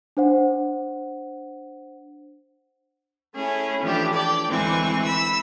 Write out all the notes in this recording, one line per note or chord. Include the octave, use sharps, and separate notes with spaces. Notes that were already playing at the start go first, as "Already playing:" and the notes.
D4 C5 F#5
A3 C#4 E4 G#4
E3 F3 A3 D4 G4
D5 G5
D2 E3 G#3 C4 G#5 C#6
B5 E6